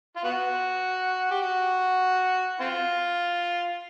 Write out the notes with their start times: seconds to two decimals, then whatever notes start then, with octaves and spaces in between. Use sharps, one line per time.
0.17 F4
0.24 B3 F#4
1.31 G4
1.42 F#4
2.60 C4 F4